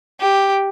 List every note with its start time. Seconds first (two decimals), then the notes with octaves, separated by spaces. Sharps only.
0.21 G4